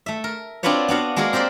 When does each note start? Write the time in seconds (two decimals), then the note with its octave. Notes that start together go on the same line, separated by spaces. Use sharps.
0.06 A3 E5
0.24 A#4
0.63 C4 D4 F4 F#4 B4 C#5
0.88 B3 D4 F#4 F5
1.16 G#3 A#3 F#4 G#4 A#4
1.33 C4 G4 A#4 C5 D5